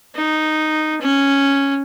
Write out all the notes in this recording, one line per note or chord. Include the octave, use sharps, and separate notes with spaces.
D#4
C#4